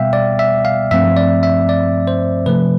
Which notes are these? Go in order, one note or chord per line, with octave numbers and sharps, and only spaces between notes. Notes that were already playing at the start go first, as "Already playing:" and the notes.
Already playing: B2 G3 B3 E5 F5 G5
D5
E5
F5
G2 F3 A3 C4 E5
D5
E5
D5
C5
C3 F3 A3 B4